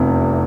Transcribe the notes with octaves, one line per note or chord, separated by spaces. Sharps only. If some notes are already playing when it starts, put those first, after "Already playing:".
Already playing: F1 E2 C3